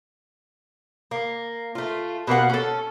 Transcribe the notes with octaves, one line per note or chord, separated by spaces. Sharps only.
A#3
A3 F4
B2 A#3 A#4 F#5
C#4 A4